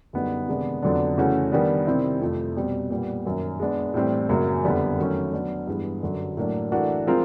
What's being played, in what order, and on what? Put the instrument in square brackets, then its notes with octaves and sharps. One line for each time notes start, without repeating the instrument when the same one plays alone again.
[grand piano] F#2 D3 G3 B3 D#4
C3 D#3 G#3 B3 D4
F2 D3 F#3 B3 D4
C#3 E3 A3 C#4 F#4
D#3 G3 B3 D4
C3 D#3 G3 C4 E4
F2 C3 F3 A3
B2 G3 C4
A#2 G3 B3
F#2 D#3 F#3 A#3
G#3 B3 D4
A2 E3 G3 C4
F#2 C#3 F#3 A#3
F2 D3 G3 B3 D4
D#3 F#3 A3 C#4
F#3 B3 D4
G2 E3 G#3 B3
F#2 D3 F#3
A2 F#3 A#3 D4
E3 A3 D4 F#4 A#4
F3 G#3 C4 F4 A#4